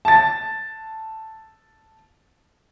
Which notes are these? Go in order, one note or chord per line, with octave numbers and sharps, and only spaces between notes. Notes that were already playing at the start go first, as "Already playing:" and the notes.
A5 A6